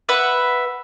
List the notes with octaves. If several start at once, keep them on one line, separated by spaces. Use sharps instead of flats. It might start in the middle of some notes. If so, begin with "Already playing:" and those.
B4 E5 F#5